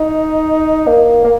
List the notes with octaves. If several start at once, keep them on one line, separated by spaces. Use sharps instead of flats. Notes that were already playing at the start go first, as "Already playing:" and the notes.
Already playing: D#4
A#3
A#3